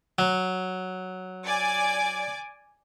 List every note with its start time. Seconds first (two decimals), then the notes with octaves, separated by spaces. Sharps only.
0.19 F#3
1.44 D5 G#5 D6